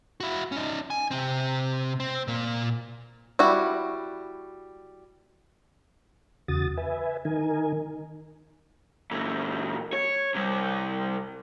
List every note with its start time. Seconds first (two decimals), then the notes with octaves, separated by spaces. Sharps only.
0.20 E4 F#4
0.52 C#4 D#4
0.90 G#5
1.11 C3 C4
2.00 C4
2.28 A#2 A#3
3.39 G3 E4 F#4
6.48 E2 C#3 F#4 D#6 A6
6.77 B4 E5 G#5
7.25 D#3 D#4 A#4 G#5
9.11 A#2 E3
9.93 C#5
10.34 C3 G3